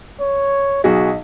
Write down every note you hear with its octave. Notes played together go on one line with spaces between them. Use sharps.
C#5
B1 F#4 G#4 D#5